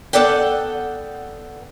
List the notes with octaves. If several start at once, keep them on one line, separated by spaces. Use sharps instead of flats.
B3 A4 D5 F#5 G5